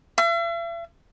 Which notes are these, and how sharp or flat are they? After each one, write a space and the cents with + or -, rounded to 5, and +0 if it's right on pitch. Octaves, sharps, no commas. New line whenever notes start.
E5 +45